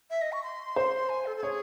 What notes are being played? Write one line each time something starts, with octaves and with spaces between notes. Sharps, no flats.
E5
D#5
C#6
C6
C5
G#5
A4
A4
G#4 C#5